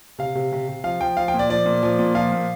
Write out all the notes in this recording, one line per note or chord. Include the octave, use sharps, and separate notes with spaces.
C3 F5
C3
C3
C3
F3 F5
F3 G5
F3 F5
G5
A#2
D5
F3 D5
A#2
F3
A#2
F3 F5
A#2